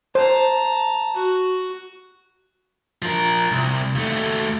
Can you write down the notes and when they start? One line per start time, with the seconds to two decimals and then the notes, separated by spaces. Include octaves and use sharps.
0.15 C5 A5 A#5
1.15 F#4
3.02 F3 A#4
3.52 C2
3.95 D#2 A3